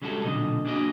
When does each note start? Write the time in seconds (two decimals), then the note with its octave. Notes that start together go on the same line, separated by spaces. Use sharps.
0.02 C#3 G3 G#3 F#4 G4 A4
0.23 B1 A#2 D3 D#5
0.65 A#3 D4 F#4 G#4 C#5 D#5